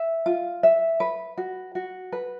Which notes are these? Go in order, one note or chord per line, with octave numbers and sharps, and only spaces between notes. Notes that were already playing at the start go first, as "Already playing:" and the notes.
Already playing: E5
F4
E5
B4
F#4
F#4
B4